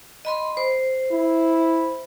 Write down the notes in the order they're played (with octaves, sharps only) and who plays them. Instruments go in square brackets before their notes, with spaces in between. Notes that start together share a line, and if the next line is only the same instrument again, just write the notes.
[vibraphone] D#5 B5 C6
C5
[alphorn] E4